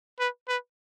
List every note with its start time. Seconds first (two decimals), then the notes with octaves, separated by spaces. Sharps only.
0.20 B4
0.48 B4